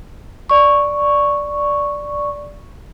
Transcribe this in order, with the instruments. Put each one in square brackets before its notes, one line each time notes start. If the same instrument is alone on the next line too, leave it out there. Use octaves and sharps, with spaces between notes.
[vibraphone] D5 C#6